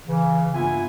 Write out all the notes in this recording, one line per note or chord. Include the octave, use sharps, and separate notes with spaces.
C#3 E3
G2 A#3 B3 F4 E5 G#5